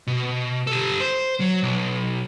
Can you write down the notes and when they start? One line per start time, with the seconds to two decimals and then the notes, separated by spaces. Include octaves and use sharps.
0.07 B2
0.67 G4 A4
1.00 C5
1.40 F#3
1.63 B1